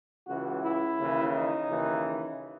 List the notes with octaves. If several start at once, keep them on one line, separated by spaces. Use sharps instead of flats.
C#2 C#3 E3 F#4
E4
D#2 C#3 E3
D#4
D#2 C#3 E3